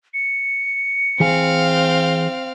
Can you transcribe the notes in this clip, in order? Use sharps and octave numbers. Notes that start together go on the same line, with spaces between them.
C#7
E3 C4 G#4 F5 G#5